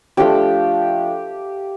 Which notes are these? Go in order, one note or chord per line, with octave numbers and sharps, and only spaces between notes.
F3 A3 D4 F4 G4 G5